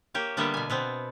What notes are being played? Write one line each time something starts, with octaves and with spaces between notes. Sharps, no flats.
A#3 G4 C#5
D3 G3 A#3 B3 E5
B2 G#5
B2 B3 C4